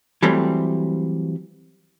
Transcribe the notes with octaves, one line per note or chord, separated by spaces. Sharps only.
E3 F#3 G3 A3 C4